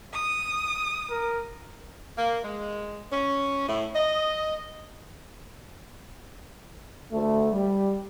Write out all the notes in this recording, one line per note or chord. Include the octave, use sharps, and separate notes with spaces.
D#6
A#4
A#3
G#3
C#4
A2
D#5
D2 A3
G3